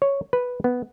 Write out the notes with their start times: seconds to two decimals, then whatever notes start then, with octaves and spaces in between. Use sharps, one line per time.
0.02 C#5
0.33 B4
0.64 B3